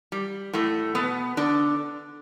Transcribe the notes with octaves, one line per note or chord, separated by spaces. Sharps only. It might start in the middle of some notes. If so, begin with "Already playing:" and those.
G3
A2 A3
B2 B3
D3 D4